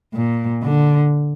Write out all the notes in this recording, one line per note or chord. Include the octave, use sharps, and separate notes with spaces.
A#2
D3